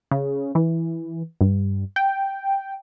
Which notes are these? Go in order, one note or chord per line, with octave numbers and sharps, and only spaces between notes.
C#3
E3
G2
G5